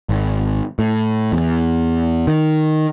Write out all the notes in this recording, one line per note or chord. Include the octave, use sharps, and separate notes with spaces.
G#1
A2
E2
D#3